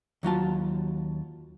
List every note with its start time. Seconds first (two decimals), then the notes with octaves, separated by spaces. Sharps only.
0.23 D#2 F#3 F4 A5